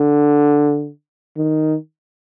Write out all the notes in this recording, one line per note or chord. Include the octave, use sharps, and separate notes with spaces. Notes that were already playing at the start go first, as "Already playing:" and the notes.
Already playing: D3
D#3